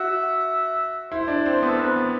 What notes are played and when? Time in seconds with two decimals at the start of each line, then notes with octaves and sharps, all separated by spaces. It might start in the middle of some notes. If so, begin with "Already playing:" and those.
Already playing: F#4 E5
1.12 E4 C5
1.28 D4
1.46 C4
1.62 B3 A4
1.79 C4 B4
1.96 B3